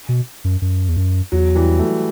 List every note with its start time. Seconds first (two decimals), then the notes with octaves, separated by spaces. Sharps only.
0.09 B2
0.44 F#2
0.62 F#2
0.89 E2
0.97 F#2
1.32 E2 F#3
1.55 E3 G3
1.79 F#3 A3